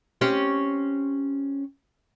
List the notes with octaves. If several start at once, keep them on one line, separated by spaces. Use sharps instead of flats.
C4 C#4 G4